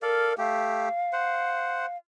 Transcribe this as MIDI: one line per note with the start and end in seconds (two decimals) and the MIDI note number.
0.02 0.33 69
0.02 0.35 70
0.02 0.33 74
0.02 0.33 77
0.38 0.89 57
0.38 0.89 67
0.38 1.97 77
1.13 1.86 72
1.13 1.86 78